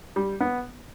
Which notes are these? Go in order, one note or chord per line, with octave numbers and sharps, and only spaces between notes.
G3
B3